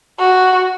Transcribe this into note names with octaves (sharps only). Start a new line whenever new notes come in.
F#4